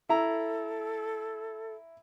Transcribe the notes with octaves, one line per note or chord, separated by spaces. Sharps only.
E4 A4 A#5